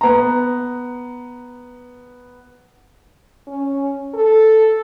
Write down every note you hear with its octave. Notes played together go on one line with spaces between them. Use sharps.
B3 A#5
C#4
A4